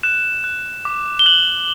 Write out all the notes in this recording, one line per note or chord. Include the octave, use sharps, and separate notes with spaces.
F#6 E7
F#6
D6
G7
F#6 F#7